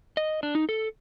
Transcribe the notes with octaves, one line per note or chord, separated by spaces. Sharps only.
D#5
D4
D#4
A4